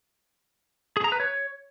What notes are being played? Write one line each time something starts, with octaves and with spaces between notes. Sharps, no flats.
G#4
A#5
B4
C#5